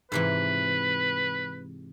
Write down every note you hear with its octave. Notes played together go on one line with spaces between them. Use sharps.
G#2 C3 E3 B4